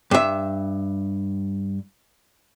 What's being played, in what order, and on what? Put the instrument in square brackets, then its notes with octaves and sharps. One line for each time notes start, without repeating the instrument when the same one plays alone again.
[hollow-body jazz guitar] G2 E5